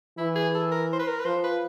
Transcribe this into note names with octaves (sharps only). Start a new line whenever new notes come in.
E3 E4
G#4
A4
A#4
C5
B4
A#4
B4
F3 C5
B4